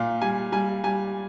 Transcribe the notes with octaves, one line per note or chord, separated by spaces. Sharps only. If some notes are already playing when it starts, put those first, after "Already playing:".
Already playing: A#2 F5
G3 G#5
G3 G#5
G3 G#5